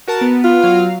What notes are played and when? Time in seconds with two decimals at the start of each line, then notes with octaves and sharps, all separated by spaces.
0.07 F#4 A#4 A5
0.21 B3
0.44 F4
0.62 F#3 F5